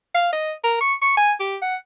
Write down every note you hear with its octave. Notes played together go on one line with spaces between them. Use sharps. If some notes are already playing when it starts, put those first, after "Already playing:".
F5
D#5
A#4
C#6
C#6
G#5
G4
F#5